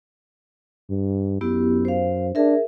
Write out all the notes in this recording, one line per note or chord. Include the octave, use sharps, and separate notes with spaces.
G2
F#2 B3 E4 G4
C5 F5
D4 G#4 A#4 E5